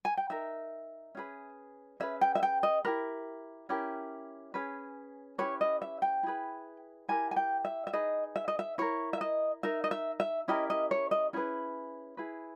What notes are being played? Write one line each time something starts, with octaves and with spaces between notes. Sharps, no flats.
G#5
G5
D#4 A#4 E5
C#4 G#4 B4
C#4 G#4 B4 E5
G5
E5
G5
D#5
E4 G4 A#4 B4
C#4 E4 G4 A#4
C#4 G#4 B4
C#4 E4 G4 B4 C#5
D#5
E5
G5
E4 G#4 B4
E4 G4 A#4 G#5
G#5
G5
E5
E5
D#4 G#4 B4 D#5
E5
D#5
E5
E4 A#4 C#5
E5
D#5
D#4 A#4 E5
D#5
E5
E5
C#4 E4 G4 A#4 D#5
D#5
C#5
D#5
C#4 E4 G#4 B4
E4 G#4 B4